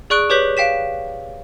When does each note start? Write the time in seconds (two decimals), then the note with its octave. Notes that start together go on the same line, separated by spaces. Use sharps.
0.10 G#4 D5 C#6 F#6 D7 G7
0.30 G4 B4 C#5 G6 B6 F#7
0.57 F5 G5 B6 E7